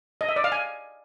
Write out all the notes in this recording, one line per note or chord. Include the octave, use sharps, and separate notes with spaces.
D#5
E5
D5
F5
G#5